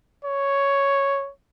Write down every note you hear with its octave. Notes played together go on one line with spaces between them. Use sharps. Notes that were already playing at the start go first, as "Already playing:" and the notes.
C#5